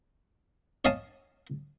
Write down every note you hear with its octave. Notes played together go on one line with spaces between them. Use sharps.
C#5 D#5 F5 G#5 A5